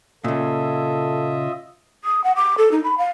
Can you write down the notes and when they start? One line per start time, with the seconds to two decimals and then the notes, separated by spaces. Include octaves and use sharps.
0.24 A#2 C#3 F4 A4 D#5 E5
2.04 D#6
2.24 F#5
2.36 D6
2.58 A4
2.72 D#4
2.84 B5
2.98 F5